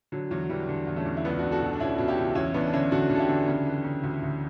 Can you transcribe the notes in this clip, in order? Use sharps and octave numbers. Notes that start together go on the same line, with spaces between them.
D3 F#3
E2 F#3
D3 E3 G3
D3
E2
A3 C#4
E2
E4
C#2 B3 D4
C#2 D4 F#4
F#4 A4
B2
D4
B2 C#4 E4
B2
E4 G4
C#2
E2 C#4 E4
E2 B3 D4
D4
D3 C#4 E4
D3 F#4 A4
D3
A4
E4 G4
D3
C#3
E3
C#3
D2
D2